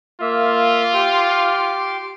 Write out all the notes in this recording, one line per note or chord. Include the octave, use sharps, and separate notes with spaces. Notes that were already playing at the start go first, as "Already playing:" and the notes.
A#3 F4 E5
G4 C6 D6